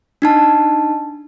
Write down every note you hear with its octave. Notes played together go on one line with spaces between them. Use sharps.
D4 D#4 A5